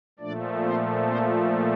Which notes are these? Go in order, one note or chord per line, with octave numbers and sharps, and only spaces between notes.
A#2 F3 A3 D4 D5
C4 C5
C4 C5